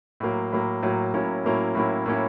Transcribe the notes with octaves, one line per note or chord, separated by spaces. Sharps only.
A2 F#3 A#3
A2 F#3 A#3
A2 F#3 A#3
A2 F#3 A#3 C#4 E4
A2 F#3 A#3 C#4 E4
A2 F#3 A#3 C#4 E4
A2 F#3 A#3 C#4 E4